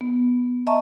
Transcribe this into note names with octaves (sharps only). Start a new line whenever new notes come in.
B3
D#5 E5 A5 A#5 C#6